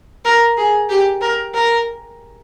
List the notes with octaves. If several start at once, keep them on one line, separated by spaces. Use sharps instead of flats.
A#4
G#4
G4
A#4
A#4